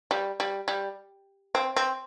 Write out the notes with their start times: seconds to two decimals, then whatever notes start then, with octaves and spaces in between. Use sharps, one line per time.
0.11 G3
0.40 G3
0.68 G3
1.55 C4
1.76 C4